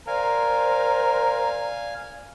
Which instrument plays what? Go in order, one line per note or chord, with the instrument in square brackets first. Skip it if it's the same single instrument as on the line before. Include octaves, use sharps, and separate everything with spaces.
[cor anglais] A#4 [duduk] C5 [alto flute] D5 [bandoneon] F5 G#5